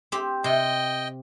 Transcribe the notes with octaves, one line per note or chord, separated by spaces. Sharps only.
C4 G4
C3 D#5 G5